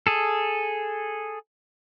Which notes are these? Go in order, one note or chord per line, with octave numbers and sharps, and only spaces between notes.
G#4 A4